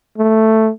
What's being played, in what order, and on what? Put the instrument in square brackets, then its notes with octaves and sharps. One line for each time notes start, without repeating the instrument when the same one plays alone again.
[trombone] A3